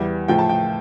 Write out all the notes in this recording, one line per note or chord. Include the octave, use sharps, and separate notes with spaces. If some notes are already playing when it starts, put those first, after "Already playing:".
Already playing: E2 E3 G3
A2 F3 G5
A5
G5